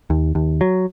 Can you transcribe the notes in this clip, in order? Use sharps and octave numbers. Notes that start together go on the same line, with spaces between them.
D#2
D#2
F#3